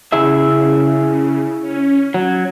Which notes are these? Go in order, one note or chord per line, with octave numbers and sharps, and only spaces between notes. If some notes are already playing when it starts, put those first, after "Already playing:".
C#3 E4 G#4 E5
C#4
F#3 G#6